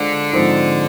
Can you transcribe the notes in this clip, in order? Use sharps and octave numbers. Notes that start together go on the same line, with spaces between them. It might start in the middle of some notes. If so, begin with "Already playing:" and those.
Already playing: D3 G#3 D4 F4 C5
G#2 F3 C4 D#4